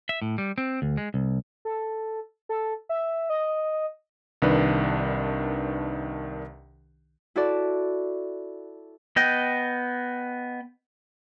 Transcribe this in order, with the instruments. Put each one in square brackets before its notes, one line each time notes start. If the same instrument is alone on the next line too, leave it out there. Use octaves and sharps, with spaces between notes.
[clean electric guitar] E5
A2
G3
C4
D2
G#3
C2
[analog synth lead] A4
A4
E5
D#5
[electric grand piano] C2 D#3 D4 B4
[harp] E4 F#4 A4 D5
[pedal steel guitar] B3 D#5 G5